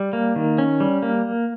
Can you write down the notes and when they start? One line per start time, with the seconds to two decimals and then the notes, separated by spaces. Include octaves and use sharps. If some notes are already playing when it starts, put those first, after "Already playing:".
Already playing: G3
0.13 A#3
0.36 D#3
0.58 C#4
0.80 G3
1.02 A#3